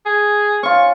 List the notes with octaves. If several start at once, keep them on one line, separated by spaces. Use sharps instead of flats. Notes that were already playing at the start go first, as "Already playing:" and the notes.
G#4
C#4 F4 C#6